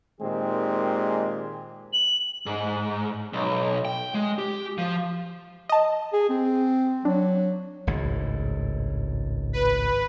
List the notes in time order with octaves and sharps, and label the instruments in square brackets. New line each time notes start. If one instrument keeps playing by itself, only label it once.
[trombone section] A#2 D#3 G#3 C4 G4 G#4
[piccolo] F#7
[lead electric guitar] G#2
B1
G5
G#3
G4
F3
[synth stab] D#5 A5
[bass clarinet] G#4
C4
[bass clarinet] F#3 [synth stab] D4
[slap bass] G#1 C#2 A2
[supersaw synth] B4